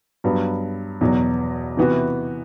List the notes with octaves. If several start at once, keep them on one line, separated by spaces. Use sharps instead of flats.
G2 F#3 B3
E2 B2 F#3
C3 E3 B3 F#4